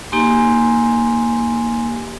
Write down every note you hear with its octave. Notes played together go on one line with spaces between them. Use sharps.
A#3 D#4 G4 G#5 C6